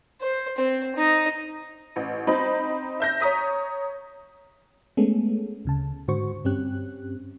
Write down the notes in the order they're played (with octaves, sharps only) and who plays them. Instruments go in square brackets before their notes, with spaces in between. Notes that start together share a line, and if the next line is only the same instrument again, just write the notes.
[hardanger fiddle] C5
C4 C5
D#4 D#5
[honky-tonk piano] A1
C4 D#4 B5
E5 G6 A#6
C#5 A#5 D#6 B6
[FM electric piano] G#3 A3 B3 C#4 G#4 A4
D2 C#3 A5
G#2 D3 F#4 C5 C#6
G2 C4 C#4 G4 F#6